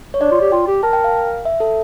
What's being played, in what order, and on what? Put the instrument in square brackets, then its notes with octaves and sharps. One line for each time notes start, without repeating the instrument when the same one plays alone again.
[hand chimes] C#5
[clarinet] D4 [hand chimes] D5
[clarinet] F4
G4
[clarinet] F4 [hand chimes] G5
[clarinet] G4
[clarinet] A#4 [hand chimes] A5
[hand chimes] G5
F5
E5
A4